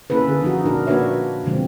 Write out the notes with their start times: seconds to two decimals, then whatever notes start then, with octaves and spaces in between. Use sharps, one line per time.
0.10 A#3 C#4 E4 A4 B4
0.28 D3 G#4
0.42 F3 D#4 F#4
0.66 A#2 D4 A#4
0.87 A#3 D4 F#4 B4 C#5 E5
1.44 B2 D3 F3 G#3 C4